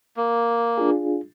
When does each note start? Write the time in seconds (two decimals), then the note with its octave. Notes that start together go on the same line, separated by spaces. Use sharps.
0.17 A#3
0.78 D4 F4 G#4